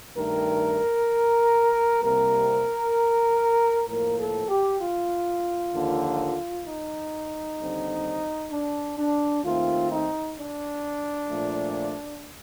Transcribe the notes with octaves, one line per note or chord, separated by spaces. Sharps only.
G2 D#3 A3 A#4
C2 C3 G3 A#3 A#4
A2 F3 A#3 A#4
A4
G4
F4
D#2 D3 F3 A#3
D#4
D#2 D3 G3 C4
D4
D4
D#2 D#3 A3 C4 F4
D#4
D4
A#2 F3 A3